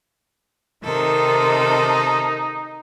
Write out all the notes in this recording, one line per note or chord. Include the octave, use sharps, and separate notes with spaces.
C3 D#3 D#4 A4